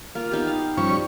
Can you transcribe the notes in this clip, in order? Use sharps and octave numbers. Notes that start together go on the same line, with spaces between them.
A#3 F4
B3 D#4 G4
F5
G2 F3 C#4 C#6
G3